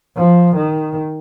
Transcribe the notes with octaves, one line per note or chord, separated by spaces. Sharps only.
F3
D#3